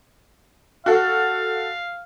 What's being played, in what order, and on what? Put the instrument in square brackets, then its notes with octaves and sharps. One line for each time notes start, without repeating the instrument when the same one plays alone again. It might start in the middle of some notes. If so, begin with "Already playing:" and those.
[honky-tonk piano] F#4 A4 [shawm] F5